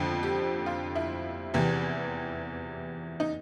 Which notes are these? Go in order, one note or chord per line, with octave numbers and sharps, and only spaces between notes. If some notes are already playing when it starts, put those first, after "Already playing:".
Already playing: F2 D3 F3
G4
F4
E4
E2 C3 E3
D#4